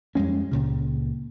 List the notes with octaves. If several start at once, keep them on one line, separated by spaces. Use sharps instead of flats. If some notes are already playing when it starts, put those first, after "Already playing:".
F2 G3 G#3 C#4
C#2 A#2 C#3